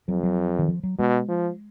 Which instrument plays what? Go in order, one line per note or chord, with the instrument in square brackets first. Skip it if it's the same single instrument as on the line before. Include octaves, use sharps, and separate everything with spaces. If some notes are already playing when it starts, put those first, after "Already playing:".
[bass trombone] F2 [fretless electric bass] F#3
[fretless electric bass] F#3
D#3
F3
F#3
[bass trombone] B2 [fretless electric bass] G#3
[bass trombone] F3